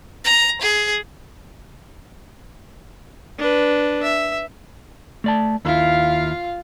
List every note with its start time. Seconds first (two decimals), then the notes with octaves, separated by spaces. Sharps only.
0.25 A#5
0.62 G#4
3.39 D4 B4
4.03 E5
5.24 A3 D5 A5
5.65 D#2 E4 F4 F5